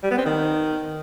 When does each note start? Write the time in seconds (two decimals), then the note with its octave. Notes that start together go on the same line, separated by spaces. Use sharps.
0.03 G3
0.11 B3
0.18 C4
0.26 D#3